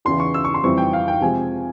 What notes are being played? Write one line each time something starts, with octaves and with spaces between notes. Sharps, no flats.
E2 C#3 E3 C6
C#6
E6
C#6
C6
F2 E3 G3 C4 C#6
G5
F5
G5
C3 F3 G#3 G#5